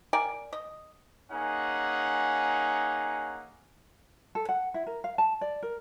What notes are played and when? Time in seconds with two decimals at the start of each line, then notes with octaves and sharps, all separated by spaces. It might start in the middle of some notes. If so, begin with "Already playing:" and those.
0.13 A#4 D5 G5 G#5
0.53 D#5
1.31 A#3 C#4 D#4 G#4 F#5
4.35 A4
4.49 F#5
4.74 E4
4.87 A#4
5.04 F5
5.18 A5
5.41 D5
5.63 A#4